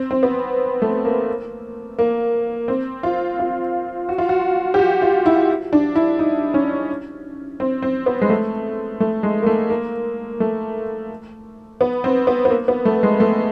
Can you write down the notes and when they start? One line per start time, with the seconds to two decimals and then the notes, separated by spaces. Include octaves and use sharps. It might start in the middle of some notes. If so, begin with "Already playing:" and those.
Already playing: C4
0.11 C4
0.23 B3
0.82 A3
1.05 A#3
1.99 A#3
2.68 C4
3.03 F4
3.39 F4
4.09 F#4
4.18 F4
4.29 F#4
4.74 G4
4.79 F#4
5.02 F4
5.26 E4
5.73 D4
5.95 E4
6.19 D#4
6.54 C#4
7.60 C4
7.82 C4
8.06 B3
8.22 G#3
8.29 A3
9.00 A3
9.23 G#3
9.42 A#3
9.46 A3
9.70 A#3
10.40 A3
11.81 B3
12.04 C4
12.27 B3
12.45 B3
12.50 A#3
12.68 B3
12.85 A3
13.03 G#3
13.20 A3